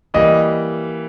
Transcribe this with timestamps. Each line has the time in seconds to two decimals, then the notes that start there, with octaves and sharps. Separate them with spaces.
0.14 E3 G3 A#3 D#5